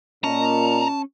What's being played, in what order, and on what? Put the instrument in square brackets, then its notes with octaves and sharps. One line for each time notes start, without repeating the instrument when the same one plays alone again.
[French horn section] A#2 D#5 [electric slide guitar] C#4 [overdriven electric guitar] A5 [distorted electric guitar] A#5